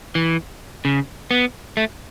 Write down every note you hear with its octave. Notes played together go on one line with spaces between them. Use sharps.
E3
C#3
B3
A3